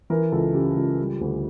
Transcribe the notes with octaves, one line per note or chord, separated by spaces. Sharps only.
E3 A#4
C#2 A4
C#3 G4
C#2
G3
D2